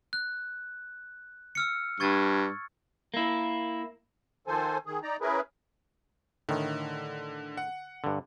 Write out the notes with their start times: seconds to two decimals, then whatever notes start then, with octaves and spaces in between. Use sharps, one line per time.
0.13 F#6
1.55 E6 F6 C#7
2.00 G2 C#6 G#6 A6
3.14 A#3 E4
4.47 D#3 F3 A4 C5 G#5
4.86 D#3 G#4
5.03 D#4 D5 A#5
5.21 C#4 E4 G#4 A#4 B4
6.49 A2 D3 D#3
7.57 F#5
8.04 G2 D3